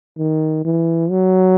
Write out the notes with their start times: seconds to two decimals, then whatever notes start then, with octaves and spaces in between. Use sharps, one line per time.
0.18 D#3
0.65 E3
1.10 F#3